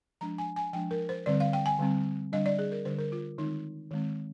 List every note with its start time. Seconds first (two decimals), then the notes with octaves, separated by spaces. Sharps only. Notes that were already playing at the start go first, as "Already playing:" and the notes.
0.21 F3 G#3 D4 A#5
0.38 G#5
0.56 G#5
0.73 F3 G#3 D4 G5
0.91 A#4
1.09 C5
1.26 D3 G3 C4 D5
1.40 F5
1.53 G5
1.66 G#5
1.79 D3 G3 C4
2.32 D3 G3 D4 D#5
2.46 D5
2.59 G#4
2.72 A#4
2.85 D3 G3 D4 C5
2.99 A#4
3.12 F4
3.38 D#3 G#3 C4 D#4
3.91 D#3 G#3 C4